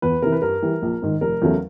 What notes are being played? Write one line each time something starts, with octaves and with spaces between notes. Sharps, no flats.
E2 B4
C3 E3 A#4
B4
G2 A#4
E3 G3
A#1
G#2 D#3
F1 A#4
E2 C#3 F#3 A3